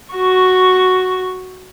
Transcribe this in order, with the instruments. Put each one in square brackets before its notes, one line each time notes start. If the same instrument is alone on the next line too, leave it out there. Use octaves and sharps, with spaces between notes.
[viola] F#4 C#6